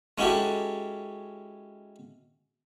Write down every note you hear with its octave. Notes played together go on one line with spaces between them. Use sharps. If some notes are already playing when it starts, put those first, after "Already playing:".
G#3 C#4 E4 F#4 G4 A4